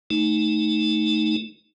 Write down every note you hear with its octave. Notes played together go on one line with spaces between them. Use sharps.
A3 D#4